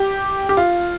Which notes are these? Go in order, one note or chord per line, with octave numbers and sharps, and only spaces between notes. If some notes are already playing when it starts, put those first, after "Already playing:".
Already playing: G4
G4
F4